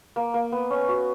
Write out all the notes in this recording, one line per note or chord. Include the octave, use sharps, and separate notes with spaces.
A#3
A#3
B3
C#4
F#4